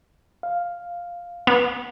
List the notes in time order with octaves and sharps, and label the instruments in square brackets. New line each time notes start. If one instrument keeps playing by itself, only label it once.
[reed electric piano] F5
[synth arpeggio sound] B3